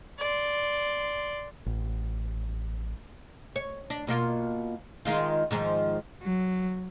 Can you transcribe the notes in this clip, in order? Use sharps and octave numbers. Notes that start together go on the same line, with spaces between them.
D5 C6
A1
C#5
D4
B2 A#3 F4
D#3 G#3 F4
G#2 D#3 F3
F#3